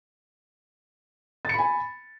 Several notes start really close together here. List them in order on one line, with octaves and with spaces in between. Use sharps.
A6 C#7 B5 G#5